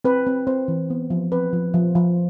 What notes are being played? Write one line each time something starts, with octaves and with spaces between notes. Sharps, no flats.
C4 B4
C4
C4 C5
E3
B3
F3
C4 B4
F3
F3
F3